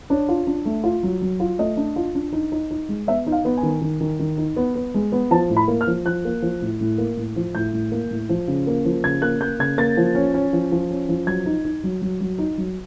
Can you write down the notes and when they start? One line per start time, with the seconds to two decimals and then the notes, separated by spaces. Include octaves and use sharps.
0.10 D4 C#5
0.29 F4
0.47 D4
0.66 A3
0.84 F4
1.03 F#3
1.21 F#3
1.40 F4
1.59 A3 D#5
1.77 D4
1.96 F4
2.15 D4
2.32 D#4
2.52 D#4
2.71 D#4
2.89 G#3
3.07 B3 E5
3.27 D#4
3.32 F5
3.45 B3
3.57 G#5
3.63 D#3
3.81 D#3
4.01 D#3
4.19 D#3
4.38 D#4
4.56 B3
4.75 B3
4.94 G#3
5.12 B3
5.31 F3 A5
5.50 A2
5.57 B5
5.68 A#3
5.81 F6
5.87 F3
6.05 F3 F#6
6.25 A#3
6.42 F3
6.62 A2
6.81 A2
6.98 A#3
7.17 A2
7.36 F3
7.55 A2 G6
7.73 A2
7.92 A#3
8.11 A2
8.29 F3
8.48 C#3
8.67 A#3
8.85 F3
9.04 C#3 G#6
9.22 A#3 F#6
9.41 A#3 G6
9.59 C#3 G#6
9.78 A#3 A6
9.97 F3
10.15 C#4
10.34 C#4
10.53 F3
10.72 F3
10.91 C#4
11.09 F3
11.27 F#3 G#6
11.46 D#4
11.65 D#4
11.84 F#3
12.02 F#3
12.21 F#3
12.38 D#4
12.58 F#3